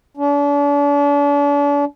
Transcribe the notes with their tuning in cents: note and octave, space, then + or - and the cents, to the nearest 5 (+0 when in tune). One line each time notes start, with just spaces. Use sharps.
D4 -40